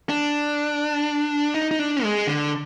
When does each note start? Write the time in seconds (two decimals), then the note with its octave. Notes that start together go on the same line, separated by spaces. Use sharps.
0.09 D4
1.54 D#4
1.71 D#4
1.79 D4
2.03 G#3
2.27 D3